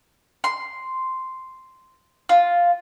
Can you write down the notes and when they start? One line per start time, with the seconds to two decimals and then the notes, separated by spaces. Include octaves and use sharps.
0.44 C6
2.29 F4